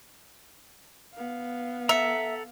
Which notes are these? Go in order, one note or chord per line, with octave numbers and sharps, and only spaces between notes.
B3 F5
A4 E5 F#5 A#5